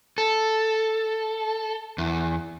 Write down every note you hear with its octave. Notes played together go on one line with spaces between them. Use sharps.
A4
E2